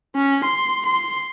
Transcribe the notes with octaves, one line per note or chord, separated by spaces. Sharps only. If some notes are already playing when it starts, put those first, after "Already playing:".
C#4
C6
C6